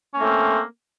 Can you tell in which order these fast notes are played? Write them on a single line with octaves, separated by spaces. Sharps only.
C#4 A#3 A3 C4